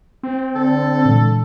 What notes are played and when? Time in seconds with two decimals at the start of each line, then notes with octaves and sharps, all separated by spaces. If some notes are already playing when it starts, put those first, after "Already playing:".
0.23 C4
0.56 D3 A4
1.05 A#2 E3 G#3